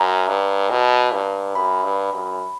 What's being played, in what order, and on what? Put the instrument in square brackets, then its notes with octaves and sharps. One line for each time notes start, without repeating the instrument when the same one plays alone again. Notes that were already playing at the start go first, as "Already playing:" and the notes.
Already playing: [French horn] F#2 [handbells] A#5
[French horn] G2
B2
G2
[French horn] F#2 [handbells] B5
[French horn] G2
F#2